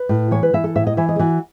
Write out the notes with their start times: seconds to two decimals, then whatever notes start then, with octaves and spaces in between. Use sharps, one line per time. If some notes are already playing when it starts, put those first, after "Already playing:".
Already playing: B4
0.09 A2
0.31 E3 C#5
0.43 B4
0.53 E3 E5
0.64 A4
0.75 A2 E5
0.87 D#5
0.97 E3 E5
1.09 D#5
1.16 G#4
1.19 E3 F#4